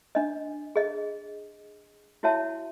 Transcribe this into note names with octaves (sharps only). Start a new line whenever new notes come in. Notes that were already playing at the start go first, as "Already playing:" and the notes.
D4 D#5
G#4 D#5
E4 F#4 C#5 E5 A5